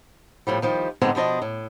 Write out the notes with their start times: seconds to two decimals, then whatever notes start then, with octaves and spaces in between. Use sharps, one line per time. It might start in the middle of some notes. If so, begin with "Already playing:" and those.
0.47 F2 A2 F3 G3
0.62 D#3 F3 G3
1.01 G#2 D3 G#3 B3 C4 D4
1.15 B2 F3 D4 D#5
1.42 A2